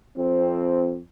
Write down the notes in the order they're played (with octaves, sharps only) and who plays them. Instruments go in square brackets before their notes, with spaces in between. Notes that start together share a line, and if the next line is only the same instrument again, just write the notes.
[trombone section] F2 C4